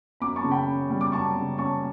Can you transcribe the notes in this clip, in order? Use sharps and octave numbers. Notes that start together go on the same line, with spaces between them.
F#2 B5 D6
A5 C#6
C#3
G5 B5
C#4
G3
D6
F#2 A5 C#6
C#3
C#4 A5 C#6